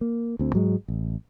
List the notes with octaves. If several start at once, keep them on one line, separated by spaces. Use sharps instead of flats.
A#3
D2 C4
G#2 F#3 G#3
A1